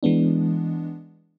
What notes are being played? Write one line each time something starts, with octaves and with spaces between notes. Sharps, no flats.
E3 G#3 B3 D4